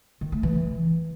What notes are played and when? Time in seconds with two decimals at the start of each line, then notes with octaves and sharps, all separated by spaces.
0.21 D#3
0.32 A3
0.43 E3